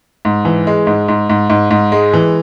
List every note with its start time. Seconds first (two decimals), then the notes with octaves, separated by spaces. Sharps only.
0.25 G#2
0.45 E3
0.67 G#3
0.87 G#2
1.08 G#2
1.30 G#2
1.50 G#2
1.71 G#2
1.92 G#3
2.13 E3